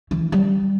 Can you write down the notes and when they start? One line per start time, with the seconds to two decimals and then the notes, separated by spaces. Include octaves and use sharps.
0.11 E3
0.32 G3